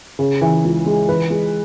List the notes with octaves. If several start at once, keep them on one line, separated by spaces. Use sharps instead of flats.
C#3
E3
C#2
G#3
E3 B4
G#3